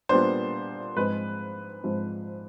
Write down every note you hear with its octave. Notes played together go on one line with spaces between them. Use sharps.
A#2 G3 B3 D4 C5
G#2 F3 G#3 C4 B4
G#2 F3 G#3 C4